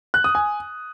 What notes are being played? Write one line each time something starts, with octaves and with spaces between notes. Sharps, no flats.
F#6
D#6
G#5